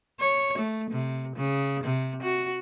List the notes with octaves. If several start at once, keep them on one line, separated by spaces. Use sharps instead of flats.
C#5
A3
C3
C#3
C3
F#4